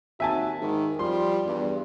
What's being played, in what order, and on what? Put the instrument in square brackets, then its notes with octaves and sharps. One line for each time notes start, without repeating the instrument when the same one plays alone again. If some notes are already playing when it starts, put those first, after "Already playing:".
[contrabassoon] D#2 [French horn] F#4 [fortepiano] E5 G#5 A5
[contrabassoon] G#2 [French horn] D#3
[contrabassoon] F3 [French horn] G3 [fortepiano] C6
[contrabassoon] E2 [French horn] G2